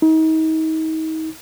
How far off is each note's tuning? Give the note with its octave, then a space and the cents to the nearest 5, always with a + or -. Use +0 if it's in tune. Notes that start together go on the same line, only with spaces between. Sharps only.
D#4 +35